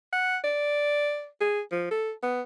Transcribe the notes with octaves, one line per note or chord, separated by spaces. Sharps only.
F#5
D5
G#4
F3
A4
B3